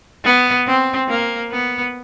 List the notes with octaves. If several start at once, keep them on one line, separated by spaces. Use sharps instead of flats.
B3
C4
A#3
B3